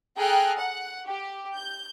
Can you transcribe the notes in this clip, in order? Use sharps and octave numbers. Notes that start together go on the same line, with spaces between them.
G#4 A4 G5 A#5 F6 F#6
F#5
G4
G6